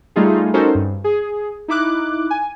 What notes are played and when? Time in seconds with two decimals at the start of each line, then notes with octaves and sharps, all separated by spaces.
0.16 G3 A3 D#4 F4 G#4
0.54 C#4 D#4 F#4 A4 A#4 C5
0.75 G2
1.04 G#4
1.68 D#4 E4 D6 F#6
2.30 G#5